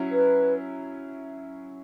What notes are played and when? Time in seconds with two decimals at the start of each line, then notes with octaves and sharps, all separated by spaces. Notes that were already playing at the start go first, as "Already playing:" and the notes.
Already playing: F#3 C#4 E4
0.11 B4